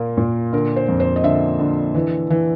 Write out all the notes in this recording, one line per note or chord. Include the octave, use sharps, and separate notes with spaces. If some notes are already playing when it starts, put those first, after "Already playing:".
Already playing: A#2 A#3
A#2
D3 A#4
C5
F2
C5
D#5
D3 E5
D3
E3
E3